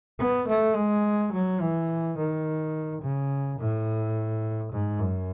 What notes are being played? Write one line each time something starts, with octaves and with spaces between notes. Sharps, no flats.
B3
A3
G#3
F#3
E3
D#3
C#3
A2
G#2
F#2